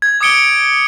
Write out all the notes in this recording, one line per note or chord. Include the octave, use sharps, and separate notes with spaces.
G#6
D6 D#6 G#6 C#7 D7 G7